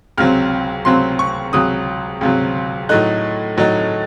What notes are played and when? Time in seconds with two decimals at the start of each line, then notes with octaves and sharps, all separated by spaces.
0.18 C#2 C3 F#3 C4 F6
0.85 C#2 C3 F#3 C4 C6
1.19 C#6
1.53 C#2 C3 F#3 D#6
2.21 C#2 C3 F#3
2.89 A2 F#3 A3 D#4 F#6
3.57 A2 F#3 A3 D#4